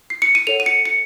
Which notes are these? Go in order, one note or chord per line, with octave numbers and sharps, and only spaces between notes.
C7
C#7
D#7
A4 C#5 F#5 F7
D#7
C#7
C#7